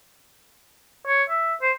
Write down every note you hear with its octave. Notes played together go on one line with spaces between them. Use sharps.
C#5
E5
C5